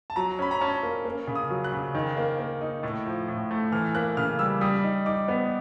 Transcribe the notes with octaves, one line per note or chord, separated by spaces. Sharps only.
A5
F#3 A#5
C#4 B5
A#5
C#4 A5
A#3
A#3
C#3
D#6
F#3
F#6
C#3
D#3
A#3
A#3
D#4
A2
F3
A2
A3
E3 F6
A#3 F#6
C#3 F6
G3 E6
G3 D#6
D#4
D#4 D6
B3